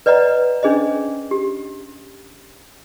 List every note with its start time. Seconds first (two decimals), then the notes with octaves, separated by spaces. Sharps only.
0.06 B4 D5 D#5 F#5 A#5
0.63 C#4 D4 G#4 C5 D#5
1.31 G4